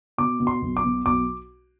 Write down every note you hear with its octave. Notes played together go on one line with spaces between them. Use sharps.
B2 D6
B2
C6
B1
D6
B2
B1 D6